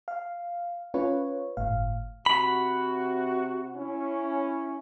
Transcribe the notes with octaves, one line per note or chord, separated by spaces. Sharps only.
F5
C#4 F4 B4 C#5
G1 A2 F5
C3 F#4 B5
C#4 E4